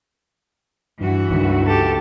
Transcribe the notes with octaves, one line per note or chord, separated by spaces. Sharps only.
G2 E3 F#4
C#2 G2 D#3
G4 A4